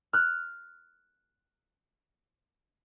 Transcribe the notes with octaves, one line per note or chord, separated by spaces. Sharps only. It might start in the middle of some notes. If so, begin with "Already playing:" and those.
F6 F#6